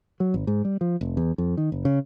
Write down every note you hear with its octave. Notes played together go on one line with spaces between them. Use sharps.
F#3
G#1
G#2
G3
F3
F1
E2
F2
D#3
F#1
C#3